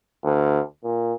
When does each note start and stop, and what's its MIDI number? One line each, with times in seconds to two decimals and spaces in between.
0.24 0.60 38
0.84 1.13 46